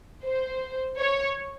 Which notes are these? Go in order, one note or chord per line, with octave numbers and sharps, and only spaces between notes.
C5
C#5